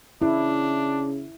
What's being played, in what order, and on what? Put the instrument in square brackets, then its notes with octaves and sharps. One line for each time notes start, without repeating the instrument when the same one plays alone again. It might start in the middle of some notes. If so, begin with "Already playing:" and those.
[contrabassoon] C#3 [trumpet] D4 [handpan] E4